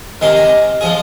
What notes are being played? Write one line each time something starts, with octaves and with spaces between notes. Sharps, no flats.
C3 D#3 G#3 C6
A#5
F3 G#3 G#4